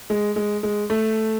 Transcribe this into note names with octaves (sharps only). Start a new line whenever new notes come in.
G#3
G#3
G#3
A3